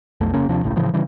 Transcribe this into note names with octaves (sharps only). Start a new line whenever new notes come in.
B1 F2 A3
F1 C#3 A#3 C#4
D#2 C3 F3 D4
G#1 C#2 A2
A2 C#3 E3 F3
C#3 E3 G3